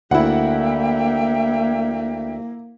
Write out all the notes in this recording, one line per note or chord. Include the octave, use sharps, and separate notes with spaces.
D2 A#3 E4 E5 F#5 G5